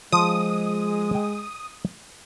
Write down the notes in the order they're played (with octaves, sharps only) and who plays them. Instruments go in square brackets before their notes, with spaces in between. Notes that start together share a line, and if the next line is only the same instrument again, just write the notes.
[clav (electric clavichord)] F3 [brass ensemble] G#3 [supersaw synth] D#6
[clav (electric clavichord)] G5